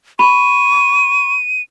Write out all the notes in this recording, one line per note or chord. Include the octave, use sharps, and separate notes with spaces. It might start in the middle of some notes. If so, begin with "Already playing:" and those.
B5 C#6 D#7